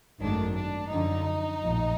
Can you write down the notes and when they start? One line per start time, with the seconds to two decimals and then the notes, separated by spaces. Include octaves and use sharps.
0.21 G#1 F#2 D#3 F#3 A3 D4
0.56 D4
0.91 F#2 D3 F3 D#4
1.61 A#1 A2 F3